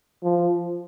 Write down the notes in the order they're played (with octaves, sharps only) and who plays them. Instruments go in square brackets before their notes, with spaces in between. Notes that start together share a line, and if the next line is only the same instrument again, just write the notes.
[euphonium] F3